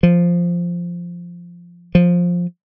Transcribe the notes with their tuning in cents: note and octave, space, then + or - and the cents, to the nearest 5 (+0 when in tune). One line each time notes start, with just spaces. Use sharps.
F3 -5
F3 +10